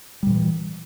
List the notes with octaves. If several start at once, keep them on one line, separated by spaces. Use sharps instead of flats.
A#2 E3 G3